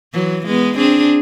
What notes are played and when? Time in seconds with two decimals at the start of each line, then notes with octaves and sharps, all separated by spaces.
0.13 E3 F#3
0.46 G#3 B3
0.76 C4 D4 G#4